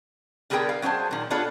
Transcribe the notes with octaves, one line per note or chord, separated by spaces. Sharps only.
D3 G3 B3 G#4 A#4 G5
F5
F#3 C#4 G#4 C5 A5
A#2 D#3
B3 D4 F4 G#4 A4 C#5